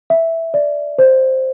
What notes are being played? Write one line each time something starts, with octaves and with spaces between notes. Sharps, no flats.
E5
D5
C5